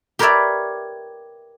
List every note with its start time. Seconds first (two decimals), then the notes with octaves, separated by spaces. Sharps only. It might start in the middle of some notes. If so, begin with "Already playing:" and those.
0.19 G4 A#4 B4 C#5 D5 E5